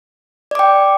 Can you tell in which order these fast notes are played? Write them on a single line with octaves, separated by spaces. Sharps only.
D5 D6 G5